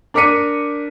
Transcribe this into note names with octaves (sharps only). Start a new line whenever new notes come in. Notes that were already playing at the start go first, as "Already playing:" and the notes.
D4 A#4 D6 B6 C#7 D#7